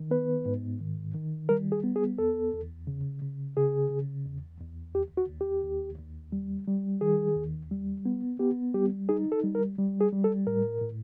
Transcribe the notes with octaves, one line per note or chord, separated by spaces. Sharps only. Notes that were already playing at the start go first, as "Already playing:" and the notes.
Already playing: D#3
B3 B4
G#2
D#3
D#3
G3 A#4
G#4
B3
G#4
E2 A4
E2
C#3
C#3
C#3 G#4
C#3
E2
E2
D#2 G4
F#4
D#2
G4
D#2
D#2
G3
G3
D#3 G#4
D#2
G3
B3
B3 G4
G3 G4
D#4 G#4
A4
G3
A#4
G3
G#4
G3
A4
A2 A#4
A2